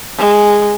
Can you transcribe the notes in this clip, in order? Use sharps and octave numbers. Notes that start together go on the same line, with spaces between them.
G#3